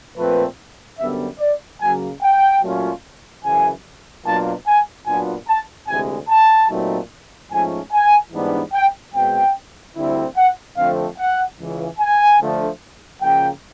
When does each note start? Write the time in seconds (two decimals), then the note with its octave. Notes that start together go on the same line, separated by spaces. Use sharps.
0.17 A#2 F3 A3 C4 B4
0.98 F#2 D3 G3 B3 E5
1.39 D5
1.80 C#3 F#3 A#3 G#5
2.22 G5
2.62 A#2 F#3 A3 C#4 F4
3.43 F#2 C#3 E3 G#5
4.25 B2 F#3 A#3 D4 F4 A5
4.66 G#5
5.06 A#2 F#3 B3 D4 F4 G#5
5.48 A5
5.88 D2 C3 E3 G#3 G#5
6.29 A5
6.69 A#2 F#3 A3 C4 D#4
7.51 G#2 F3 A3 C#4 G#5
7.92 G#5
8.32 G#2 E3 G3 B3 D4
8.73 G5
9.14 B2 G#3 C4 G5
9.96 D2 D3 G3 C4 E4
10.36 F#5
10.77 F2 D3 F3 A3 C4 F5
11.18 F#5
11.58 C#2 C#3 E3
11.99 G#5
12.40 D3 F3 A3
13.21 C#3 F3 A#3 G5